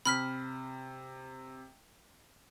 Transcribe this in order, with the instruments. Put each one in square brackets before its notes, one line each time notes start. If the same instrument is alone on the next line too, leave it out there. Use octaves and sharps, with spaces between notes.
[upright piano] C3 [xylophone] B5 F6 B6